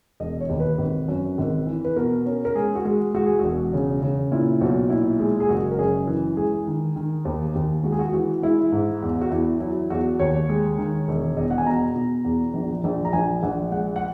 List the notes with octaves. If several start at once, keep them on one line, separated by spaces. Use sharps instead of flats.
E1 D#5
C#5
D#2
B4
G#1
F#2
G#1
E3
B4
B2 A#4
C#4 A#4
A#4
G#3 G#4
F#4
G#3
G#3 F#4
G#4
E1 F#4
C#3
C#3
A#2 E4
B1 F#4
A#2 E4
G#3
G#4
F#1 F#4
A#4
F#2 G#4
E3
G#3 G#4
D#3
D#3
D#2
D#2
G#3 F#4
G#4
F#4
E3 F#4
G#3 E4
G#2
E2
F#4
E2 E4
F#3 E4
E2 F#4
D#2 C#5
G#3
D#3
E1
E2 D#5
F#5
G#5
B2 A#5
B2
E2
A#1
A#1
A#5
A#1 G#5
A#1 F#5
G#3 F#5
F#5